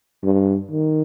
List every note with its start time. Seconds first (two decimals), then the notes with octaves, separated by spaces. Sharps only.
0.23 G2
0.71 D#3